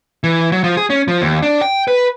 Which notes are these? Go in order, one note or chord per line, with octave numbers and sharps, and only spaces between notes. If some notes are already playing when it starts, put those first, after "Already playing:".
E3
F#3
F3
G#4
C#4
F3
D#2
D4
G5
B4